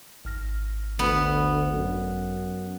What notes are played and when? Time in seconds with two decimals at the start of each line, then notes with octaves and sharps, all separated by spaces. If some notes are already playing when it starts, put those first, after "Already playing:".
0.25 G#1 F6 A#6
0.99 D2 B3
1.73 F#2